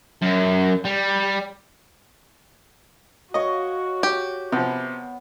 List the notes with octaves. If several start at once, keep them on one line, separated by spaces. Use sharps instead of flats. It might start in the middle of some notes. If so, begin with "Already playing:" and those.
F#2
G3
F#4 C#5 D#5 F5
G4
C3 F3 B3